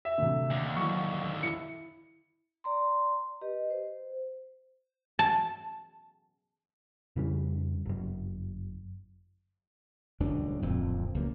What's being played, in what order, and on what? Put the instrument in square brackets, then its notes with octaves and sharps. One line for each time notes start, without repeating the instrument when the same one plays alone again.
[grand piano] E5
[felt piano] D2 C3
[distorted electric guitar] D#2 D3
[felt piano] F#3 E4 [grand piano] C#6
[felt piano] E4 [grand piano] C#7
[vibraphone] D5 A#5 C6
G4 B4 D#5
C5
[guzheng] A5
[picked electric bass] F2 C#3 G3 C#4
G1 F#2
[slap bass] D#1 C#2 F#2 D4
D1 F2 A#2 C4
C#2 F#2 A#3